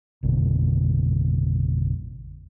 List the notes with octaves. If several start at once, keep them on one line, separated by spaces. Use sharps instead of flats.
A1 F2 B2 D3